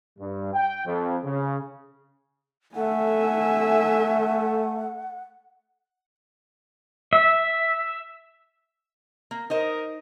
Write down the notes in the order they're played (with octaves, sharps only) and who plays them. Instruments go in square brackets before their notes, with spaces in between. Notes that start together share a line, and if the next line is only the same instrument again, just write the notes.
[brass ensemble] G2
G5
F2
C#3
[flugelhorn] A3 [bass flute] A4 [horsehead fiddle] E5 G#5 [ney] F#5
[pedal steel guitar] E5
[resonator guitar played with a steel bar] A#3
[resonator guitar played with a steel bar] D#4 C5 D#5 [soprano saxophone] A#4